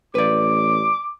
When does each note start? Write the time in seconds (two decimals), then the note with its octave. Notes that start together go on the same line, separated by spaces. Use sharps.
0.15 A1 B4 D5 D6